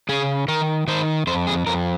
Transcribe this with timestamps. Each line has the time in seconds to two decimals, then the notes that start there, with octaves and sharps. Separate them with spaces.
0.09 C#3 G#4
0.48 D#3 A#4
0.88 D#3 C5
1.27 F2 C5
1.47 G#4
1.67 F2 A#4